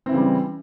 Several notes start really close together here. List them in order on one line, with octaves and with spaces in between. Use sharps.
C4 E4 E3 C#3 G3